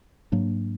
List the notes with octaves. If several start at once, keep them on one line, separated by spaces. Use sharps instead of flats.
G#2 F#3 A#3 D4